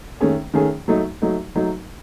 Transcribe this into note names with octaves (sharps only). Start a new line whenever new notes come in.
D#3 A3 C#4 G#4
D#3 A3 C#4 G#4
F#3 A3 D#4
F#3 A3 D#4
F#3 A3 D#4